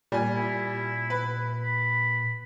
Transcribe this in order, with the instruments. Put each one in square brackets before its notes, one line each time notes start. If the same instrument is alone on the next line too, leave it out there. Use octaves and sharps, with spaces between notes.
[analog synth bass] A#2 [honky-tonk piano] G3 G#5
[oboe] E4
[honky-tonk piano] B4
[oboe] B5